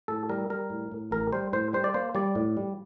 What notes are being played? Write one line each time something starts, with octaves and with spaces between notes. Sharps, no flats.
A2 A4
G3 A#4
G3 A#4
A2
A2
A1 A#4
G3 C5
A2 C5
G3 C5
D5
A#3 C5
G3 D5
A2
G3